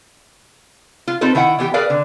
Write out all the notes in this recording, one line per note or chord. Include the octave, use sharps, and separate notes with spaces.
F4
C4 D#4 F4 A4 B4
D#3 E4 E5 F#5 G5
E3 B3 G4 G5
G#4 A#4 B4 D5 F5 G5
D3